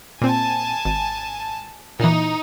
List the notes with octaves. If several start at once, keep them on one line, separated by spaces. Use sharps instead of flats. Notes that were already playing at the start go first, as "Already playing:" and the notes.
A#2 C4 G#5 A5
G#1
A#2 E3 D#4